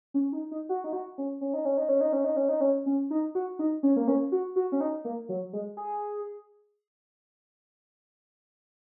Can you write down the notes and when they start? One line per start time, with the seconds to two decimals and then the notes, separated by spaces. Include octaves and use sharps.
0.14 C#4
0.33 D#4
0.51 D#4
0.69 F#4
0.84 D#4
0.93 F#4
1.18 C#4
1.41 C#4
1.54 D#4
1.65 C#4
1.78 D#4
1.89 C#4
2.01 D#4
2.13 C#4
2.24 D#4
2.36 C#4
2.49 D#4
2.61 C#4
2.86 C#4
3.11 D#4
3.35 F#4
3.59 D#4
3.83 C#4
3.96 A#3
4.08 C#4
4.32 F#4
4.56 F#4
4.72 C#4
4.81 D#4
5.05 A#3
5.29 F#3
5.53 G#3
5.77 G#4